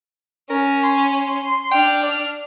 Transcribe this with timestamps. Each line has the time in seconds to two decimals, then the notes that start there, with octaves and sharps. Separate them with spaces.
0.50 C#4 A#4
0.84 C6
1.71 D4 G5 F6
2.03 D5